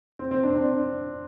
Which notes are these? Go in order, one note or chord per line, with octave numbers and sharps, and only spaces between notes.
C4
C4
D4
C4
D4